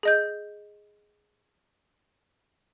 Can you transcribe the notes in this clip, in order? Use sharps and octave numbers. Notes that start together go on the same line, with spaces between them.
G#4 D#5 G6